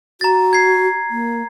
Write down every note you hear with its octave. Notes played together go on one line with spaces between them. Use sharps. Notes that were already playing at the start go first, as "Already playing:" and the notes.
F#4 A#5 A6
G#6 C7
A#3